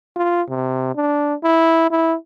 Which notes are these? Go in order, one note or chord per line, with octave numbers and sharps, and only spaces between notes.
F4
C3
D4
E4
E4